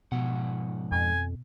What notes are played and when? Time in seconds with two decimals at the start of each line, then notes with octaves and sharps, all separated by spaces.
0.12 G#2 B2 F3 F#5
0.92 F2 G#5